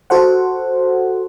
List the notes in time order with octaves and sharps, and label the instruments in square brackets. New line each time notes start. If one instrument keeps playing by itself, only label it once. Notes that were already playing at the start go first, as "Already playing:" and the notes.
[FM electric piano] F#4 A4 C5 F#5